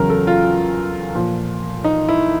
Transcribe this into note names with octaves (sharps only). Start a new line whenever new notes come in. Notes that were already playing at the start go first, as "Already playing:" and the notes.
Already playing: E2 C#3 F#3 A#4
A4
F4
A#2 F3
D#4
E4